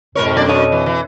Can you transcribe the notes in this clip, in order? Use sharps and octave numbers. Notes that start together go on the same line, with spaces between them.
F2 G#2 B2 A#4 C#5
F#2 A#3 D4 D5
C#5 D#5
E3
E3